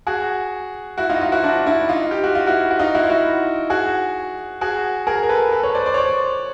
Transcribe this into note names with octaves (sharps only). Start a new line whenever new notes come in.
F#4 G#4
E4 F#4
D#4 F4
D#4 F4
E4 F#4
D4 E4
D4 E4
D#4 F4
G4
F#4
F4
E4 F#4
F#4
D#4 F4
E4 F#4
F4
E4 F#4
F#4 G#4
F#4 G#4
G#4 A#4
A#4
A4 B4
A4 B4
B4 C#5
C5 D5
C5 D5
C#5
C5 D5